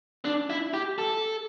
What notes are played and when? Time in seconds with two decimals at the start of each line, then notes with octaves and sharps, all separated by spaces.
0.25 D4
0.50 E4
0.74 G4
0.98 A4